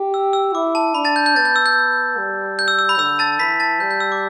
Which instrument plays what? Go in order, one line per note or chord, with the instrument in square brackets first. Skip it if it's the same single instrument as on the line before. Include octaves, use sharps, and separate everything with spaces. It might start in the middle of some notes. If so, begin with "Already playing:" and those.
Already playing: [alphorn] G4
[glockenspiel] E6
E6
[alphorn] E4 [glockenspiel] D6
[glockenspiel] A5
[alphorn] D4 [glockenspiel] B5
[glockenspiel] A5 A6
G6
G6
[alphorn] B3 [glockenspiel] A6
[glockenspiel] G6
E6
G6
[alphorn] G3
[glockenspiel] G6
E6
E6
B5
G6
[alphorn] D3 [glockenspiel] E6
[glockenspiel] A5 A6
[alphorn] E3 [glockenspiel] B5 B6
[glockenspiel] A5 A6
[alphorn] G3 [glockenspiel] G6
[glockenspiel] G6
E6
D6